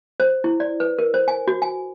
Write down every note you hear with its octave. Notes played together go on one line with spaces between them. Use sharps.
C5
E4
D5
B4
A#4
C5
G#5
F#4
G#5